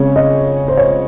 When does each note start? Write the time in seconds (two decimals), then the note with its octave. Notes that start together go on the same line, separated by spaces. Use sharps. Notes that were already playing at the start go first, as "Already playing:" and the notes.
Already playing: C#3 G#3 C4 C#5
0.16 D#5
0.68 C5
0.77 C#5